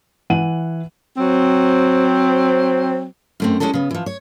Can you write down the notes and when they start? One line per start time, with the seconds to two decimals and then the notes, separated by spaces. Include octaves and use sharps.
0.30 E3 F#5 D#7 F#7
1.18 F#3 C4
3.40 F#2 A3 C4
3.60 G3 G#3 C#4 D#4 E4 A4
3.74 C#3 B3
3.91 E3 F3
4.06 C#5